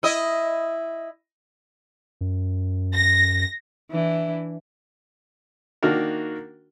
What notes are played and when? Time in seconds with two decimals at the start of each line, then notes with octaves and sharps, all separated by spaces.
0.03 E4 D#5
2.21 F#2
2.93 A#6
3.91 E3 D4 E4
5.83 D#3 A#3 D4 F#4 A#4